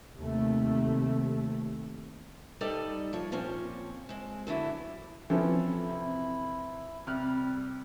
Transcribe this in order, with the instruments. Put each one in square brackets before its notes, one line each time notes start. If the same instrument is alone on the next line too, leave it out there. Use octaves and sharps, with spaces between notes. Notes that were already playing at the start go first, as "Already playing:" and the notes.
[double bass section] D#2 C3 A3
[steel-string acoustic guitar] G3 D#4 A4 D5 D#5
F3 C#5
A#2 F3 C4 C#4
G#3 C4
E2 D3 F#3 E4
[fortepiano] E3 F3 [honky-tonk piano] C4 C#4 A4 [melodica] E4
[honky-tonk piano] C3
[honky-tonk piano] C3 F6 F#6 [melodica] G3